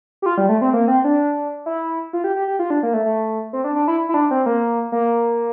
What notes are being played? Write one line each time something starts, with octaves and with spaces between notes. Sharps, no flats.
G4
F4
G3
A3
C4
A#3
C4
D4
E4
F4
G4
G4
G4
F4
D4
A#3
A3
A3
C4
D4
D4
E4
E4
D4
C4
A#3
A#3